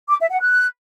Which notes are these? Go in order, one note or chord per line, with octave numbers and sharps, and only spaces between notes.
D6
E5
F#5
F#6